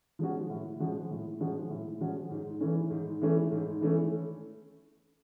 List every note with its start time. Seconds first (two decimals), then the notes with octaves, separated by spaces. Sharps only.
0.19 F3 G#3 C#4 F#4
0.50 A2
0.79 F3 G#3 C#4 F#4
1.10 A2
1.40 F3 G#3 C#4 F#4
1.70 A2
2.01 F3 G#3 C#4 F#4
2.31 G#2
2.60 E3 A3 C#4
2.91 G#2
3.21 E3 A3 C#4
3.52 G#2
3.81 E3 A3 C#4